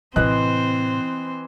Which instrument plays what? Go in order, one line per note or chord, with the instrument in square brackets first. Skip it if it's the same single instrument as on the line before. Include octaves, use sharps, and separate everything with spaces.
[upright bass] A2 C3 [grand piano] E3 D#5 F#6 [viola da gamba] C4 C5